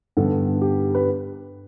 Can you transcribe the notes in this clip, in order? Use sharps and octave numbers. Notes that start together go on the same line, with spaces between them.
G2 D3 B3 A4
G4
B4